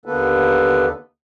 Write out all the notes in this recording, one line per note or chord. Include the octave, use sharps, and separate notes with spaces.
D#2 D3 A#3 B3 A4 B4